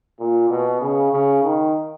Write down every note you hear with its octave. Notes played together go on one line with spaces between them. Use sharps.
A#2
B2
C#3
C#3
D#3